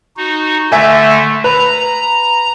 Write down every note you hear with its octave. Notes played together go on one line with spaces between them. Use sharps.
D#4 F#4
D3 A3 E5 G#5
B4 A#5